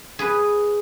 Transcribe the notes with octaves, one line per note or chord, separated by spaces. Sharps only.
G#4 B4